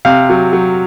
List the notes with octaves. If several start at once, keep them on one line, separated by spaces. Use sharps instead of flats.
C3 F5
F#3
F#3